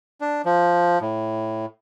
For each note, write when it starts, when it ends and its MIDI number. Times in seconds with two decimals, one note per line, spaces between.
0.21 0.42 62
0.45 0.99 53
1.01 1.66 45